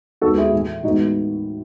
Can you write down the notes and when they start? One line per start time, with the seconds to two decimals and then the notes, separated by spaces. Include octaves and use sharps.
0.22 D#2 D#3 G#3 B3 F#4 A4
0.37 E4 G#4
0.53 A2 E3 A3
0.83 A2 E3 G#3 B3 D#4 F#4